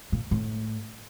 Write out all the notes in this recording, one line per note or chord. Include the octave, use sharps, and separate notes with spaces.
A#2
A2